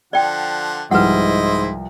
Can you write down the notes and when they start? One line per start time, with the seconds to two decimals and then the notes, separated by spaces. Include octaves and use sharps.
0.13 D3 F3 D5 F#5 G5
0.91 C2 G#2 F3 E4 B4 C5 D#5 F#5